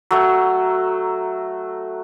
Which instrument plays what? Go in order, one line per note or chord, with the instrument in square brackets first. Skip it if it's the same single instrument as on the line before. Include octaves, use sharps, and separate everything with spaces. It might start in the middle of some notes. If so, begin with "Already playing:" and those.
[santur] F#3 A3 A#5